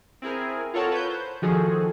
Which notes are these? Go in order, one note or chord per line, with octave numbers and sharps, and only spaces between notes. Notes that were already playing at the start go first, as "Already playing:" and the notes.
C4 E4 G#4 A#4
F4 A4 A#4 C#5 F#5 A5
B4 C#5 G6
C5
D#3 F3 F#4 G#4 A4